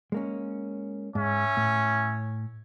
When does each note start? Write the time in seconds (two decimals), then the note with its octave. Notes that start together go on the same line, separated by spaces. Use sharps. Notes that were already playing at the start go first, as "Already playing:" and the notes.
0.12 G#3 A#3 C#4
1.15 G#2 C#4 E5
1.57 A2